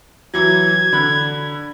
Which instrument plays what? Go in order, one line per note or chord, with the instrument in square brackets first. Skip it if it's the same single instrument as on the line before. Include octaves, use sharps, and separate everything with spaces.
[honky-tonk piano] E3 F#3 [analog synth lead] G#6
[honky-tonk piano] D3 B5 F#6